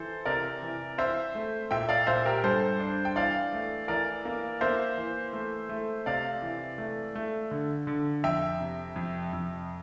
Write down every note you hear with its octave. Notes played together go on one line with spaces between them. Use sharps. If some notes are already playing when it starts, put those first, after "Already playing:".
Already playing: E3 A4 C5
C3 A#4 D5
E3
C4 C5 E5
A3
A#2 E5 G5
D5 F5
A#2 C5 E5
G4 A#4
G2 A4 C5
D4
G5
E3 D5 F5
A3
E3 A#4 D5
A#3
A#3 C5 E5
E3
A3
A3
C3 D5 F5
E3
A3
A3
D3
D3
F2 E5 G5
C3
F2
F2